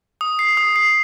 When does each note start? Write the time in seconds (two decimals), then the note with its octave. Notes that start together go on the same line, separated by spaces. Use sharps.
0.21 D#6
0.39 C7
0.57 D#6
0.76 C7